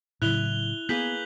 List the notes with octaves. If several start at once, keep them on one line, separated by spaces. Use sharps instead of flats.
A2 C#3 F#3 E4 F#6 F7 G7
A#3 B3 G#4 B4 G6 B6 F#7